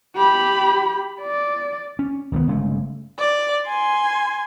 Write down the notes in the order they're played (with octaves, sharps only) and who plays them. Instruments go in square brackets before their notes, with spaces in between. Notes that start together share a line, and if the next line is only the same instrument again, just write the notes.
[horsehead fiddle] G4 B5
D5
[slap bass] C#4
C#2 D#3 G#3 B3
G1 C#3 G#3 A3
[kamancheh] D5
G#5 C6